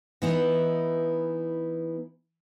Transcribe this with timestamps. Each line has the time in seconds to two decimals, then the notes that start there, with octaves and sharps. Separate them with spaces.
0.22 E3 B3 D#4 E4